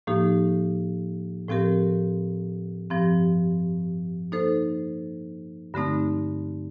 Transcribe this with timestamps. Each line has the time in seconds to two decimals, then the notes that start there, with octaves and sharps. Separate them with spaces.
0.07 A2 F3 A#3 D#4 G4
1.48 A2 F3 C4 G4 A#4
2.90 G2 F3 C4 G4
4.32 A#3 D#4 A4 C5
5.74 G2 D3 A3 C4 D#4